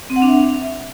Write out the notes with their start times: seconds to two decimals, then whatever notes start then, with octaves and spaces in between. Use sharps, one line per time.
0.10 C4
0.16 F#5
0.22 D4
0.28 E5